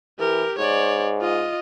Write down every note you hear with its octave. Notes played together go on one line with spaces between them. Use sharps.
E3 G4 A#4
G#2 C#5 D5
F4 D#5